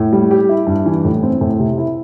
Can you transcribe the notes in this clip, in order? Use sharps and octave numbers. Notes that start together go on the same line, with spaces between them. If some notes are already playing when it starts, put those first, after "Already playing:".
Already playing: A2
G3
G4
E4
G2
E3
A2
C4
A2
C3
E4